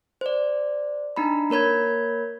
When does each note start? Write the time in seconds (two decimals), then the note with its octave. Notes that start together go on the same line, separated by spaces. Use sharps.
0.21 C5 D5
1.16 D4 D#4 A#5 B5
1.50 A#3 A#4 C#5 B5 G#6